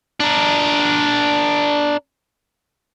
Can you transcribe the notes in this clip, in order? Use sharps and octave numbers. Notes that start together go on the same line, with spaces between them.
D4 A#4